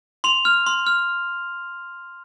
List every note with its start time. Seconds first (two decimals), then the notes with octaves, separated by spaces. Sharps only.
0.24 C6 F7
0.45 F6
0.67 C6
0.87 F6